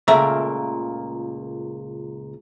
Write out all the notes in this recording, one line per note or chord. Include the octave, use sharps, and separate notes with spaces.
C#2 A#2 A3 A#3 E5 A#5